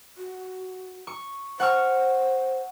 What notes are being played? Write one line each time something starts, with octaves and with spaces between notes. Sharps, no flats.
F#4
C#6
C5 F#5 C#6 F6